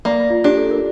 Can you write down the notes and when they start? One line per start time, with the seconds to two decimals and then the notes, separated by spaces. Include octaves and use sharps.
0.05 A#3 D5
0.30 F4
0.44 D4 G4
0.57 A4
0.71 A#4